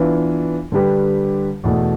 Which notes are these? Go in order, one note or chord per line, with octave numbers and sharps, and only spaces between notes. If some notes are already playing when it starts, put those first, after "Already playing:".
Already playing: E3 B3 D4 F4
D3 G3 D4 G4 B4
E2 B2 A3